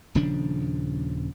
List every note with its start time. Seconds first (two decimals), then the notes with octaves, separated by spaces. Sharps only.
0.15 D#1 C#3 F3 D4